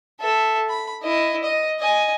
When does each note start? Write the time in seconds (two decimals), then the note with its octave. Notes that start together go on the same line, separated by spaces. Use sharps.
0.20 A4 E5
0.69 B5
1.03 E4 D#5
1.43 D#5
1.79 D#5 G#5